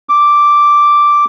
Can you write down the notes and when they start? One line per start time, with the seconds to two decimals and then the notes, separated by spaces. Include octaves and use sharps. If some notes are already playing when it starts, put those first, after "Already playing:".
0.09 D6